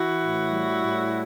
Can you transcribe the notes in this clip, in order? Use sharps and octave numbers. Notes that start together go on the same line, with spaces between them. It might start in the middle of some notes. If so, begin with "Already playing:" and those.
Already playing: E3 E4 F#4
A2
G3
A2